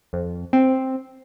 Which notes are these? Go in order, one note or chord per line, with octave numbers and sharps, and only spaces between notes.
F2
C4